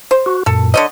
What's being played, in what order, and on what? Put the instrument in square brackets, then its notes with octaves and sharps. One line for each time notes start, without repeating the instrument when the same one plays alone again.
[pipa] C5
[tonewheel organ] F#4
[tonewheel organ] F#2 A#2 [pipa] A4
[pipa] D3 C#5 D#5